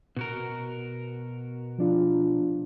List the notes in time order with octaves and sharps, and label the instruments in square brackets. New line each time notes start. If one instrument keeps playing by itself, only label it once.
[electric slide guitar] B2 F#4 A#4
[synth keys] F3 D4 F4